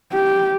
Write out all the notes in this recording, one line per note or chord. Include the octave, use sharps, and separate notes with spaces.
G4